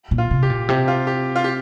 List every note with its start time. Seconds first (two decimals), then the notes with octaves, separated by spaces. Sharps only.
0.11 A#2
0.18 F4
0.31 C3
0.43 G4
0.50 A#2
0.69 C3 G4
0.88 F4
1.07 G4
1.36 F4
1.44 G4